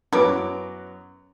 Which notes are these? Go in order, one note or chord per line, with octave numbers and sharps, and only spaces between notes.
F#2 F#3 B3 C#4 E4 B4 D6